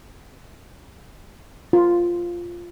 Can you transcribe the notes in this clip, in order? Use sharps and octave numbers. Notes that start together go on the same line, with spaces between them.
F4